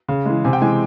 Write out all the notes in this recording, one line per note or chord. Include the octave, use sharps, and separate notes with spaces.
C#3
E3 G#3
C3 G#5
G5
E3 G#3 G#5